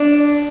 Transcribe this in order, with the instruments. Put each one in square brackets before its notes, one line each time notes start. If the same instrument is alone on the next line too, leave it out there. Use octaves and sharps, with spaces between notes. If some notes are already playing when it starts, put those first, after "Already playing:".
Already playing: [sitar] D4